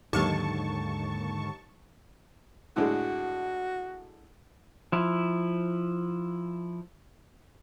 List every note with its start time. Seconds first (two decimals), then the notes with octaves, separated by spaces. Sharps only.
0.13 D#2 G#2 D3 F#3 G#3 G4 A5 C#6
2.76 A2 D3 G#3 F#4
4.92 F3 E4